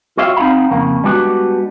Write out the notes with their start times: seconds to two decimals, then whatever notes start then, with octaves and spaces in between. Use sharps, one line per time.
0.17 F4 F#4 C#5 E5 F5 G5
0.37 C4 D#4 F5 F#5 B5
0.70 F2 C#3 A#3
1.04 G3 G#3 B3 D4 D#4 F#4